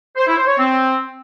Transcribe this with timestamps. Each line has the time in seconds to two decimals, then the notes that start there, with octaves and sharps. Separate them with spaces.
0.17 C5
0.27 E4
0.37 C5
0.48 C#5
0.58 C4